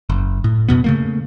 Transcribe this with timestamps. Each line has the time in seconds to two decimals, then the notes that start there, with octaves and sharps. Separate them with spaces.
0.09 F#1
0.44 A2
0.69 F2 B2 B3
0.84 C#3 A3 A#3